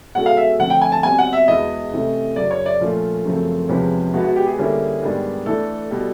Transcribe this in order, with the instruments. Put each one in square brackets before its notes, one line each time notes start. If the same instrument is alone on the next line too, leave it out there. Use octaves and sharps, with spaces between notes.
[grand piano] B2 G#3 C#4 F#4 A4 [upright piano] F#5
[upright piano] F5
E5
[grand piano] D3 F3 A3 C4 [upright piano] F#5
[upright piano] G5
G#5
A5
[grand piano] B2 G3 C4 [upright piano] G#5
[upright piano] F#5
E5
[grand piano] E2 B2 G#3 B3 E4 [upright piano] D#5
[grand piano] C3 E3 A3 C#4 E4
[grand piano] F#2 C#3 F#3 [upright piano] D5
[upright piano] C#5
D5
[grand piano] A#2 F3 A3 C#4 F4
F#2 C#3 F3 A3 C4
[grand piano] E2 C3 F3 G#3 C#4 [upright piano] B4
[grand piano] B2 G#3 B3 [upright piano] F#4
[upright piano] F#4
G4
G#4
[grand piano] D3 G3 A#3 C#4 E4
G#2 D#3 G3 B3 D4
[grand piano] E3 A3 D4 [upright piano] A4
[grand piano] B2 G3